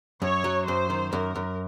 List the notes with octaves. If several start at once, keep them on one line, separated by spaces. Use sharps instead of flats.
F#2 C#5
F#3
F#2 C5
D#3
F#2 A#4
F#2